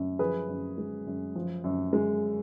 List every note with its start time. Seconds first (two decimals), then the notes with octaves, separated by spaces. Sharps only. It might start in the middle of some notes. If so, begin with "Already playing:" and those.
Already playing: F#2
0.19 F3 G#4 B4
0.49 F#2
0.78 G#3
1.07 F#2
1.35 F3
1.64 F#2
1.93 G#3